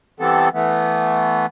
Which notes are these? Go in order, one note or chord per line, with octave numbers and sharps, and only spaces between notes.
E3 G3 B3 C4 A4
E3 A3 B3